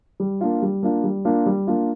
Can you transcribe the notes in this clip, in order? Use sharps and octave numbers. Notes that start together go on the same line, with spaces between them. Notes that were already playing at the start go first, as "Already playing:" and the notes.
G3
A#3 D4 F4
G3
A#3 D4 F4
G3
A#3 D4 F4
G3
A#3 D4 F4